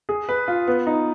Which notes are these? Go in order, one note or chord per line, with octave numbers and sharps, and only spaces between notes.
G#4
B4
F4
B3
D#4